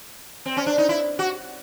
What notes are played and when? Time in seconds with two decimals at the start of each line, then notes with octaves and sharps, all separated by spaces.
0.46 C4
0.57 C#4
0.66 D4
0.78 D#4
0.89 E4
1.19 F#4